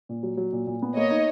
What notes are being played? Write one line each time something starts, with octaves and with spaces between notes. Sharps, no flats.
A#2
F#3
F#3
A#2
A#2
B3
A#3 C#5 D#5
D#4